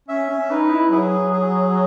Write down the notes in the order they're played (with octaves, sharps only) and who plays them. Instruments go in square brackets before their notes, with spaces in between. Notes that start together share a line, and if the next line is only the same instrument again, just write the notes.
[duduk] C#4 [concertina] E5
[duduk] C#4
[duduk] D#4 [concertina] B4
[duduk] E4
[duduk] F#3 [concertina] G#4
[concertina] G#4